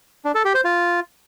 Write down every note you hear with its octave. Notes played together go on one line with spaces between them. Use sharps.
D4
A4
G4
C5
F4